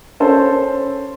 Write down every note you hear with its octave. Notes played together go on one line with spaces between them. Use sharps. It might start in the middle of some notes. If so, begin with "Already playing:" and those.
C#4 A4 C5